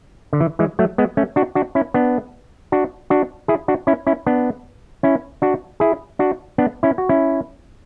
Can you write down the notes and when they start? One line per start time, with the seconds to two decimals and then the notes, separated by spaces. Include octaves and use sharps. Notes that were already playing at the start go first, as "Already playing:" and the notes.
0.33 D3
0.41 E3
0.59 E3 G#3
0.79 F#3 A3
0.98 G#3 B3
1.17 A3 C#4
1.36 D4 F#4
1.55 D4 F#4
1.75 C#4 E4
1.94 B3 D4
2.72 D4 F#4
3.10 D4 F#4
3.48 E4 G#4
3.68 D4 F#4
3.87 C#4 E4
4.07 C#4 E4
4.26 B3 D4
5.03 C#4 E4
5.42 D4 F#4
5.80 E4 G#4
6.19 D4 F#4
6.58 B3 D4
6.83 C#4 E4
6.98 F#4
7.09 C#4 E4